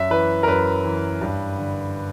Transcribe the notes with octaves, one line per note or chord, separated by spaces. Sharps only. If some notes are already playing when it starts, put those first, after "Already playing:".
Already playing: F#2 E5
E3 B4
A#4
F#2 B4
E3
G2
D3